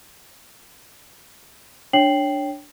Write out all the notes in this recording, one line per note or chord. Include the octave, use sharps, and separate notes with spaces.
D4 C#5 G5 C7 F#7